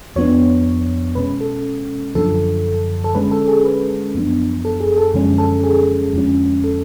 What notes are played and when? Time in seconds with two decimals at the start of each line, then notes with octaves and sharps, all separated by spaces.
0.16 F2 F3 B3 D4 C#5
1.15 B2 G#3 C#4 B4
1.41 A4
2.15 F#2 D3 F3 A4
3.04 A4
3.15 D3 G#3 C#4 B4
3.31 A4
3.48 G#4
3.65 B4
4.15 F#2 F3 B3 D4
4.65 A4
4.80 G#4
4.98 A4
5.14 F#2 D3 F3 G#3 C#4
5.38 A4
5.63 G#4
6.13 F2 D3 F3 G#3 C#4
6.64 A4